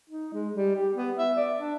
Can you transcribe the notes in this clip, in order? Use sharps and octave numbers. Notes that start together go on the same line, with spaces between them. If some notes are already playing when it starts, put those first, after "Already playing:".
D#4
G#3
G3
G4
B3
E5
D5
D4